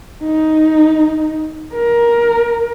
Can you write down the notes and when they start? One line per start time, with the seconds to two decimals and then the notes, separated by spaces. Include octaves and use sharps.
0.23 D#4
1.74 A#4